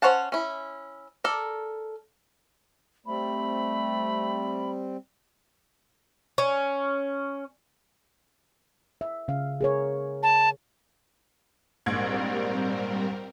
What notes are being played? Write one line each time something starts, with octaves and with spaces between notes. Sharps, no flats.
C#4 C5 C#5 F#5 A5
C#4 E4
A4 A#4 D5
G3 A3 C4 B5
C#4
E5
C#3 F5
G#4 A#4 C#5
A5
A#1 G#2 G3 C4 A#4 G#6